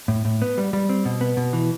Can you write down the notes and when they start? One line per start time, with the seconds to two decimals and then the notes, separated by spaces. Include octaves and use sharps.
0.08 A2
0.25 A2
0.42 B3
0.58 G3
0.73 G3
0.89 C4
1.05 B2
1.21 B3
1.37 B2
1.53 E3